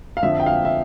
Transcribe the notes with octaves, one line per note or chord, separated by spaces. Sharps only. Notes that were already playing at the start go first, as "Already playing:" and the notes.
F5
F2 D3 F3 C4 E5
G5
F5
E5